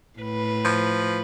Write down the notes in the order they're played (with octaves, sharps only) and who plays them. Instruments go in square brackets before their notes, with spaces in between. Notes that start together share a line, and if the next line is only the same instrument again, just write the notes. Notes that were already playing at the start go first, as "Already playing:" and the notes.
[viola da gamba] A2 B4
[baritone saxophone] F3